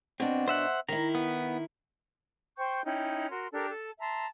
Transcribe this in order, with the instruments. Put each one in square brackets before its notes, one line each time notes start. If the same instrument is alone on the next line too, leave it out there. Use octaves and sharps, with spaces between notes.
[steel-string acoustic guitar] B2 D4 [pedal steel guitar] C4
[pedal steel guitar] C5 E5 F#5
[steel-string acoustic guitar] D#3 E4 [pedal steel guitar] A#5
[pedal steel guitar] B3
[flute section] C5 G5 C#6 G6
C#4 D#4 E4 G5
F#4 A#4 C6
D4 G4 A4 A#4
A4 A5
E5 A5 A#5 C6